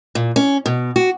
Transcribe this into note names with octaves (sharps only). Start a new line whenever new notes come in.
A#2
C#4
B2
F#4